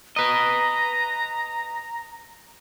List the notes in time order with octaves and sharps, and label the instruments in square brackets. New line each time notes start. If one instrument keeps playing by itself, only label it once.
[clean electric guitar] B4 D#5 [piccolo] A#5